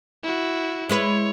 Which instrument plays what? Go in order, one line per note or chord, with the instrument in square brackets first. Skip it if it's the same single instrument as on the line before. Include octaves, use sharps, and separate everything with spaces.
[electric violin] E4 F#4
[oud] G#3 E4 B4 [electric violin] C#5